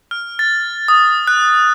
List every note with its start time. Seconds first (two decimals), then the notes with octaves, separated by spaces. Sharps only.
0.11 F6
0.39 A6
0.88 D#6
1.27 F#6